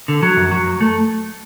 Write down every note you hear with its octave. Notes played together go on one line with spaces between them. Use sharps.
D3
F#3
F#2
F#3
F#2
A3